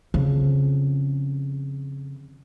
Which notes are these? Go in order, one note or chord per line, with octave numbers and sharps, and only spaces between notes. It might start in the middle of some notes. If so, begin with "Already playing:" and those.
F2 C#3